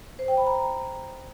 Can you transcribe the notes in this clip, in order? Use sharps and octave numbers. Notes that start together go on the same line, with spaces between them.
C5
G5
B5
A#5